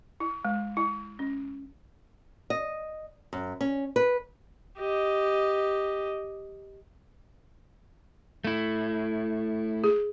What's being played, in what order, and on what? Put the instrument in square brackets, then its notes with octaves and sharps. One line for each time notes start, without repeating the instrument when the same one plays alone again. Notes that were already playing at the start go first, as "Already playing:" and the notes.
[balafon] E4
G#3
E4
C#4
[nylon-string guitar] D#5
F#2
C#4
B4
[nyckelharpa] G4 D#5
[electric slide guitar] A3 E4
[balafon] G#4